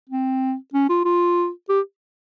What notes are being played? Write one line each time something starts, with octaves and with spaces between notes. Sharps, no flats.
C4
C#4
F4
F4
G4